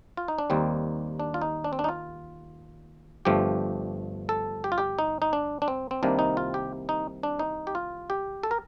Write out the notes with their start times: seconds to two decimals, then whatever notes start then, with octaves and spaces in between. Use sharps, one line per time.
0.17 F4
0.28 D#4
0.39 D4
0.50 D#2 D#3 G3 A#3 C4
1.20 D4
1.34 F4
1.42 D#4
1.64 D4
1.73 C4
1.79 D4
1.84 D#4
1.89 F4
3.25 G1 G2 F3 A3 G4
4.29 A4
4.64 G4
4.72 F4
4.78 G4
4.99 D#4
5.22 D#4
5.33 D4
5.62 D4
5.68 C4
5.91 C4
6.03 C2 C3 D#3 A#3 D4
6.19 D#4
6.37 F4
6.54 G4
6.89 D#4
7.23 D4
7.39 D#4
7.67 G4
7.75 F4
8.10 G4
8.43 A4
8.51 A#4